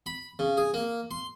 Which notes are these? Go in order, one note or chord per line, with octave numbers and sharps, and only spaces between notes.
B5
C#3
G#4
A#3
C6